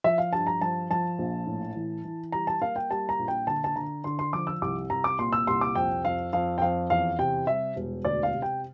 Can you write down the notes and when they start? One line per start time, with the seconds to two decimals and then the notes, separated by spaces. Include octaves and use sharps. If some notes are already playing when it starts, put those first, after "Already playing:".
0.04 F3 E5
0.18 F5
0.33 G2 A5
0.47 A#5
0.61 F3 A5
0.90 F3 A5
1.18 A#1
1.47 A2
1.76 E3
2.05 E3
2.32 G3 A#5
2.47 A5
2.61 A#3 F5
2.76 G5
2.90 G3 A5
3.09 A#5
3.19 A#1
3.28 G5
3.47 D3 A5
3.64 A5
3.76 D3 A#5
4.04 D3 C6
4.19 C6
4.33 F3 D6
4.47 E6
4.62 C2 D6
4.90 C2 A#5
5.04 D6
5.19 A#2 C6
5.33 E6
5.47 C2 C6
5.61 D6
5.76 F2 G5
6.05 F2 F5
6.33 F2 F5
6.58 G5
6.62 F2 F5
6.90 E2 F5
7.19 C3 G5
7.47 G3 E5
7.76 E1
8.05 D2 D5
8.23 F5
8.33 C3
8.42 G5